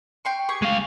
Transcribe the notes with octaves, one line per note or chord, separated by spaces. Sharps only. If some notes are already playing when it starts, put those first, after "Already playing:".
G5 C6 C#6
G4 G#4 C#6
G#3 F5